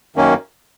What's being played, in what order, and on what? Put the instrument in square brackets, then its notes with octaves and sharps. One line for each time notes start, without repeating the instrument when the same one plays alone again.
[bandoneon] F#2 D#3 A#3 C#4